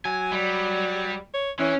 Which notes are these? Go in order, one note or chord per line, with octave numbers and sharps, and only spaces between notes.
F#3 G#5
G3
C#5
E3 C#4